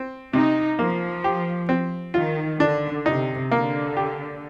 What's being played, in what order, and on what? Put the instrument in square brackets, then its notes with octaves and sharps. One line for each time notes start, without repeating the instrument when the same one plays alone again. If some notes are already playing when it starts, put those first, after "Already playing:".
Already playing: [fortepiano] C4
[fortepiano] C3 [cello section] D#4
[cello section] F3 [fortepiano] A#3
[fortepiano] G4
C4
[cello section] D#3 [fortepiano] F4
[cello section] D3 [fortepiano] D4
[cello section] C3 [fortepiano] D#4
[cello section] D3 [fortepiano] A#3
[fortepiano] G4